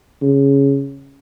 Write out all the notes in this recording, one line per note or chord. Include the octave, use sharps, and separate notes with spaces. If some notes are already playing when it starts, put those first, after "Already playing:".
C#3